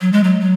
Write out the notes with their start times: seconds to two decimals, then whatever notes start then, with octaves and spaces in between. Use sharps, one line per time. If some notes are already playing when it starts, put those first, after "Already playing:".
0.01 F#3
0.12 G#3
0.23 F#3
0.40 F#3